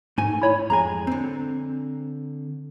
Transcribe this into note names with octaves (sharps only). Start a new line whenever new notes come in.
G#2 A3 G#5
E4 C#5 B5
F2 G#3 G#5 A#5
D3 C4